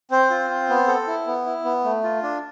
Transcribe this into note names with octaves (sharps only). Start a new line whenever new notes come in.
C4 C5
F4
C4
B3
A4
E4
B3
E4
B3
A3
F4
D4